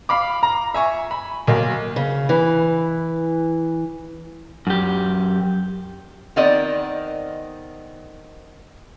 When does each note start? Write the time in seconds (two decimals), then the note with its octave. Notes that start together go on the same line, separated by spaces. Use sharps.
0.09 F5 B5 D6
0.43 A#5
0.74 E5 G#5 C#6
1.11 B5
1.47 B1 A#3
1.96 C#3
2.29 E3
4.67 F#2 G4
6.36 D#3 B3 C4 A#4 D5 D#5